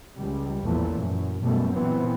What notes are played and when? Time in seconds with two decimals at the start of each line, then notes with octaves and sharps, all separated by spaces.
0.17 C#2 G3
0.63 A1 E2 A#2 E3 F3 A3
0.99 F#2
1.42 F#2 B2 G3 A3
1.74 A#2 E3 B3 C4